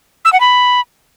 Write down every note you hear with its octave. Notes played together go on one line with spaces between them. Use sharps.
E6
F#5
B5